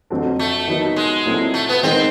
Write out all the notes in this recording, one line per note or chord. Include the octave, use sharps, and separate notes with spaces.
F2 D3 F#3 A3 C4
A3
D#3 F#3 B3 D#4 F#4
G#3
A#2 F#3 A3 C4 E4
A3
B3
D#3 G#3 B3 C4 D#4